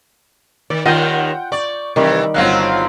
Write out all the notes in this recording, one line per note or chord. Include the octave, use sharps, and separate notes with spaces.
D#3 D5
D#2 D#3 F4 D#5 F#5 G5 G6
D5 C#6
C3 D#3 E3 G3 G4
G1 F#3 C4 F4 F5 F#6